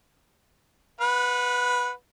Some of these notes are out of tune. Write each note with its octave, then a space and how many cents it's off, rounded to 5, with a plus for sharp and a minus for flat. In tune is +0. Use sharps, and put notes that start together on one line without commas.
B4 +0 F#5 -30